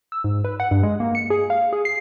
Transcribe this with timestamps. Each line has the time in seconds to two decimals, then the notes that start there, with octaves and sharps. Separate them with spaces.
0.12 E6
0.24 G#2
0.44 B4
0.60 F#5
0.71 G2
0.83 G#3
1.00 A#3
1.15 C#7
1.30 G#4
1.50 F5
1.73 G#4
1.85 C7